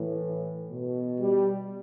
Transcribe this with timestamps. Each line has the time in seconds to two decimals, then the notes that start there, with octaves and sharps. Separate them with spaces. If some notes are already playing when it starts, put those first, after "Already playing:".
Already playing: A2 E3
0.72 B2
1.19 G3